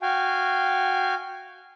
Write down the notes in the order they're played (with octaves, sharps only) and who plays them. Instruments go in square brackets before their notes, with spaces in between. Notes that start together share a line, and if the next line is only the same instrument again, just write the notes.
[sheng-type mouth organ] F#4 F5 G5 G#5